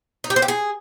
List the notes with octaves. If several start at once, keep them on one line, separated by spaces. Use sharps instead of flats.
D#4
G4
C5
G4
G#4